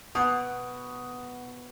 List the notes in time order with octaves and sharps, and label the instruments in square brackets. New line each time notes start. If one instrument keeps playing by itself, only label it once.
[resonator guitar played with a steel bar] B2 [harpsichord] B3 [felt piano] D#6